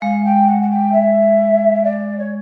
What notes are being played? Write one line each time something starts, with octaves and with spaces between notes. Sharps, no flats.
G#3 F5
G5
F#5
F#5
G5
E5
D5
C#5